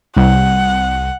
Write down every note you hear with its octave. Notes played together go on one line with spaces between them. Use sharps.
C2 F#5